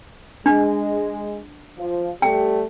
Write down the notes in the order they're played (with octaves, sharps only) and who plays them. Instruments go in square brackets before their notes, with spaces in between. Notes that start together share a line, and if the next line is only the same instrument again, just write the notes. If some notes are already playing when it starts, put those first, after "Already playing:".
[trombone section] G#3 [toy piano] D4
[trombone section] F3
[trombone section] G3 A3 G4 [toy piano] G5